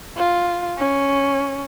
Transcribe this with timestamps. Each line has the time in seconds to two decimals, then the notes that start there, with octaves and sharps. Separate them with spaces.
0.16 F4
0.78 C#4